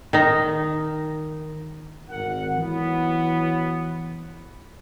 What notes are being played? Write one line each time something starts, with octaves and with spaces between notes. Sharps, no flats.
D#3 D#4
G#1 A#4 F#5
E3 F#3 B3